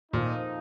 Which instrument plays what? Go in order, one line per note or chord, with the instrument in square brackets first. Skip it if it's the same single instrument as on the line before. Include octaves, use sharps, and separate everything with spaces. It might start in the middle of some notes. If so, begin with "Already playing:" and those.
[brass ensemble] F2 F3 A#3 D#4 [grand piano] A#2